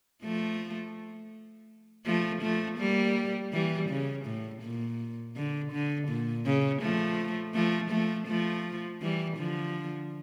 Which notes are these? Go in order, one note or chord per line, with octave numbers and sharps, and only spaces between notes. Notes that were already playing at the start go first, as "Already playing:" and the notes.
F3 A3
F3 A3
F3 A3
G3 A#3
E3 G3
C#3
A2
A#2
D3
D3
A#2
C#3
F3 A3
F3 A3
F3 A3
F3 A3
E3 G3
D3 F3